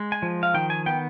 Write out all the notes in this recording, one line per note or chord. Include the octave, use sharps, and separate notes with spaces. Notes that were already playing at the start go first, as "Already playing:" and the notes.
Already playing: G#3
G#5
F3
F5
D#3 G5
G#5
B3 G5